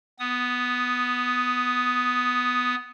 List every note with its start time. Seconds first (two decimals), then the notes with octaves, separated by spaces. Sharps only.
0.19 B3 D#6